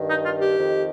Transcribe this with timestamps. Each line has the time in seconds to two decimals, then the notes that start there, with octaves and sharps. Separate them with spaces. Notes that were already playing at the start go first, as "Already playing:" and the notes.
Already playing: G2 D#3
0.08 D#4
0.24 F4
0.40 G4
0.56 F2 D#3